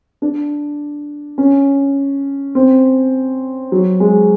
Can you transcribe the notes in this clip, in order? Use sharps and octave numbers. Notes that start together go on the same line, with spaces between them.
D4
C#4
C4
F#3
G#3